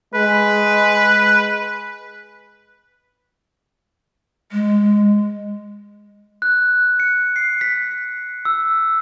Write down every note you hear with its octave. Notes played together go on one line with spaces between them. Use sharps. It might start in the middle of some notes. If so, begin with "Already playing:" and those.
G#3 B4
G#3
F#6
C#7
C7
B6
E6